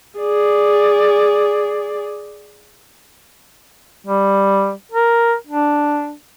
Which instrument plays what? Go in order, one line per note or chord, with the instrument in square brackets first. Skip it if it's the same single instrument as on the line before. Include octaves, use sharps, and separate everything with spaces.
[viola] G#4 D5
[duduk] G3
A#4
D4